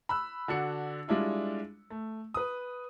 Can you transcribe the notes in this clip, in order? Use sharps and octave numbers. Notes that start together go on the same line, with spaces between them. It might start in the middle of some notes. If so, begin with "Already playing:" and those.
B5 E6 F#6
D3 D4 F#4 C#7
G3 G#3 D4 E4 F4
A3
B4 D#6